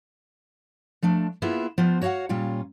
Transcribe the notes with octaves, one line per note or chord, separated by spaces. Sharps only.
F3 A3 D4
A#3 B3 E4 F4 G#4 B4
F3 B3 F4 C5
F#4 C#5 D5 F5 F#5
A#2 G3 C#4 F4